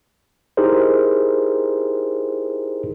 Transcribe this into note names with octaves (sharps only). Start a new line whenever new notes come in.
D#4 E4 G4 G#4 A#4 C5